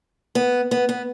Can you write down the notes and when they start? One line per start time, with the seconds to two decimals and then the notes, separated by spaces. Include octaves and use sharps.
0.35 B3
0.71 B3
0.89 B3